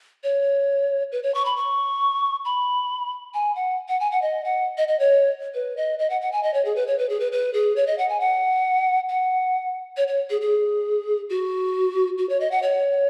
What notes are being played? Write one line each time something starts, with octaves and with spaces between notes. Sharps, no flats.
C#5
B4
C#5
C#6
B5
C#6
B5
G#5
F#5
F#5
G#5
F#5
D#5
F#5
D#5
D#5
C#5
B4
D#5
D#5
F#5
F#5
G#5
D#5
C#5
G#4
B4
C#5
B4
G#4
B4
B4
G#4
C#5
D#5
F#5
G#5
F#5
F#5
C#5
C#5
G#4
G#4
F#4
F#4
C#5
D#5
F#5
C#5